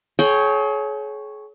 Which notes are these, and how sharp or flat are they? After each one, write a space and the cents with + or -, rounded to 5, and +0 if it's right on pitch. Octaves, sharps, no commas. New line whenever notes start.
G#4 +40 C#5 +0 G5 +0